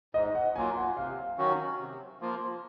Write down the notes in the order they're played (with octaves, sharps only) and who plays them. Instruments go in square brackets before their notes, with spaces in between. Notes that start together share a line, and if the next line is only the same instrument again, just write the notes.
[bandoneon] G#2 [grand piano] D#5
[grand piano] F#5
[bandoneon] F#3 A#3 F4 [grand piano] G#5
[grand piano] F#5
[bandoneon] C3 [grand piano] F5
[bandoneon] D#3 F#3 C#4 F#4
C3
F3 A#3 F4